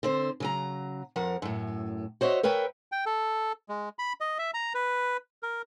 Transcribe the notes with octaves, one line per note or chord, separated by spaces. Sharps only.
D3 C4 C5
C#3 F#3 A#5
F2 F3 A#4 F#5
F#2 A2
F#4 C5 C#5 D#5 E5
A#4 B4 C#5 E5 G5
G5
A4
G#3
B5
D#5
E5
A#5
B4
A#4